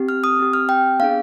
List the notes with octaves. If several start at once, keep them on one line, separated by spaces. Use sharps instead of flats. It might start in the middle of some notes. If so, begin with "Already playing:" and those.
Already playing: C4 G4
F6
D#6
C4 G4
F6
G5
B3 D4 G#4 F5